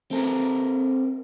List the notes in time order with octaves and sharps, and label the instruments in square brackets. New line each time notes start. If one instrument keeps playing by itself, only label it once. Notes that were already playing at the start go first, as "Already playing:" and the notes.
[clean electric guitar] C4 A4 A#4